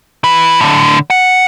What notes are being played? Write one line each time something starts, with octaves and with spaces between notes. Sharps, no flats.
E3 B4
A2 D3
F#5